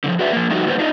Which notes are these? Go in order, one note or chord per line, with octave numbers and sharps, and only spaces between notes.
D3 D#3 F3
F#4 G#4 B4 D5 E5
F3 A#3
F3 G3 A3 D#4 F#4 G4
A#2 D#3 G3 B3 D4 C5
D4 D#4 F4 D#5